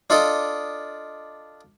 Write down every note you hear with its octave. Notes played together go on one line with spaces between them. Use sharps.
D4 F4 A4 D5 D#5